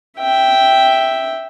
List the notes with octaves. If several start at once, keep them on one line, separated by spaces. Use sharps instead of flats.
E5 G5